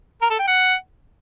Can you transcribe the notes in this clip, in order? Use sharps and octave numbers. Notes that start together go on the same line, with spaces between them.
A#4
A4
G5
F#5